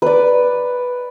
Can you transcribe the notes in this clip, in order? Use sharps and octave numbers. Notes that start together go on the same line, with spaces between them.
B4 D5